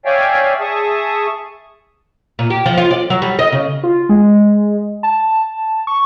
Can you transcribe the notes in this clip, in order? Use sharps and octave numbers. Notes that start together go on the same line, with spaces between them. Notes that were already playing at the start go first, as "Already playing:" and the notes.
C#5 D5 E5 F5 G5 G#5
G#4 E5 A5 C#6 D#6
A#2
G4
F3
F4
D5
F#3
G3
D#5
C#3
F4
G#3
A5
C#6